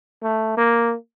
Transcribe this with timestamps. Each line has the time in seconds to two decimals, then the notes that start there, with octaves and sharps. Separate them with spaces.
0.23 A3
0.57 A#3